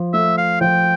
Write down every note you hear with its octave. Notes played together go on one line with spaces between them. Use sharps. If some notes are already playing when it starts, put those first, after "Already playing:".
Already playing: F3
A3 E5
F5
F3 G5